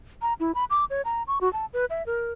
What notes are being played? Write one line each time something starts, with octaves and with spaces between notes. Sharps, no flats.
A#5
E4
B5
D6
C#5
A#5
C#6
F#4
A5
B4
E5
A#4